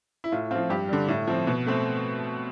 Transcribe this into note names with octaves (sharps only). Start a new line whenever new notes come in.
E4
A2 F4
F3 C4 F4
G2 G4
D3 G3
A2
F3 C4
B2
A3 C4